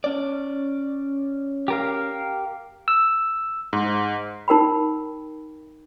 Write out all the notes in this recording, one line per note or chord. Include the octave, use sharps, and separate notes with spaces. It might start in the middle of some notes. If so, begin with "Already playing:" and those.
C#4 D5
G4 A#4 F5
E6
G#2
D#4 A#4 G5 B5